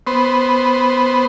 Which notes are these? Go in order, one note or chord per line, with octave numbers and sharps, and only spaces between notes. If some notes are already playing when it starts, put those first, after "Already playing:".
B3 C5